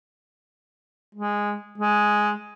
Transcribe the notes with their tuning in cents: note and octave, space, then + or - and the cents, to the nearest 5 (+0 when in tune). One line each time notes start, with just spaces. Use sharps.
G#3 -10
G#3 +5